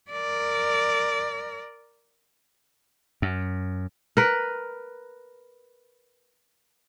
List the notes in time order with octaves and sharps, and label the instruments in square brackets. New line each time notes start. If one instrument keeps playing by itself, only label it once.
[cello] A#4 D5
[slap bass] F#2
[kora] A#4 B4